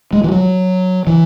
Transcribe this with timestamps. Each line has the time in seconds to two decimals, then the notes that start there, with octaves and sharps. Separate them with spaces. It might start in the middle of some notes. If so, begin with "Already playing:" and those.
0.13 G#3
0.24 E3
0.31 F#3
1.07 E3